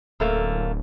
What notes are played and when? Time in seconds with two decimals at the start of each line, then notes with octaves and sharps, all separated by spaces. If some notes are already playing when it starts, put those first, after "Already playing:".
0.20 D1 F#2 A3 A#3